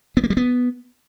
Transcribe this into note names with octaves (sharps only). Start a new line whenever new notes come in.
B3
A#3
G3
B3